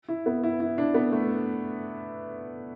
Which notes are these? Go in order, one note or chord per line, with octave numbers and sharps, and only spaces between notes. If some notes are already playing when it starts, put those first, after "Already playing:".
E4
B3
E4
E4
D4
B3
A3